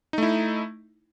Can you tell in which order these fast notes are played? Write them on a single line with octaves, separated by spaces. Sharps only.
D#4 A3 E4